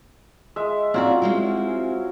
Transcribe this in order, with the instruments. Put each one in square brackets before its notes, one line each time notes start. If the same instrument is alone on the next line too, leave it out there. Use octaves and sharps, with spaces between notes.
[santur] G#3 E5
[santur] F#3 C#4 F4 [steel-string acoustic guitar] C4 E4 D5
[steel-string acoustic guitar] G#3 C4 E4